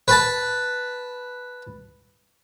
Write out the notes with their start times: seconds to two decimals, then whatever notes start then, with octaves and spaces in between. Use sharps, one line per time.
0.08 B4 A5